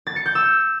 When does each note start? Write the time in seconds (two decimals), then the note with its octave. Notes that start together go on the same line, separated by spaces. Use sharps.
0.07 A6
0.16 C#7
0.26 G6
0.35 E6